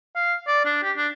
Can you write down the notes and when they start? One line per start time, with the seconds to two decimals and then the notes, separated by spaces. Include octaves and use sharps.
0.16 F5
0.47 D5
0.65 D4
0.83 G4
0.97 D4